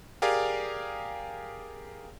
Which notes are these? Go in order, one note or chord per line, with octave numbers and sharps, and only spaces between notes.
G4 G#4 A#4 D5 F5 G#5